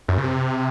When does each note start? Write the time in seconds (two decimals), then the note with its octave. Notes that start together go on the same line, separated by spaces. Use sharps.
0.08 F#2
0.18 C#3
0.23 C3